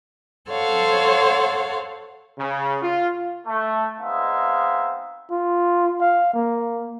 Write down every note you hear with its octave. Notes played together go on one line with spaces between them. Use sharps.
A4 C5 C#5 F5 F#5
C#3
F4
A3
G#3 B3 C4 D#4 E5 F5
F4
F5
A#3